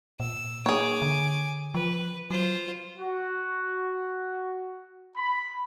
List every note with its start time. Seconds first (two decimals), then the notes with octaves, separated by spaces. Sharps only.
0.20 A#2 E6
0.66 A#3 G#4 C#5 G#5 D6
1.02 D3
1.74 F3 B4
2.30 F#3 F4 C5
2.98 F#4
5.17 B5